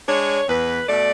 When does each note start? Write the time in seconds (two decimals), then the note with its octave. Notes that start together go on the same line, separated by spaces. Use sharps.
0.08 G#3 D4 C#5
0.49 E2 B4
0.89 B2 A3 D5